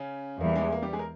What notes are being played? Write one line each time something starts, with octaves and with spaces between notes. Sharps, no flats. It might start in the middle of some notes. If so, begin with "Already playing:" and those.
Already playing: C#3 C#4
E2 E3 G3 A#3
G#3
A#3
G3 G4
G#3 G#4
A#4